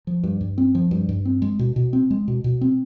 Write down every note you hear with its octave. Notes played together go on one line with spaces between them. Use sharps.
F3
G2
G2
C4
F3
G2
G2
C4
G#3
B2
B2
C4
G#3
B2
B2
C4